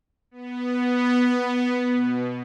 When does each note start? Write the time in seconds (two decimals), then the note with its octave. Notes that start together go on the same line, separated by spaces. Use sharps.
0.31 B3
1.93 B2